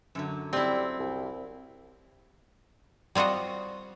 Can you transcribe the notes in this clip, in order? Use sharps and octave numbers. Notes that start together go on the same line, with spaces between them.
F#2 D3 F#3
G3 C4 E4
C2
G3 C4 F4 F#4 D#5